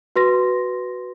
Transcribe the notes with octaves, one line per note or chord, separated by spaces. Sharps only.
F#4 B4 C6 A#6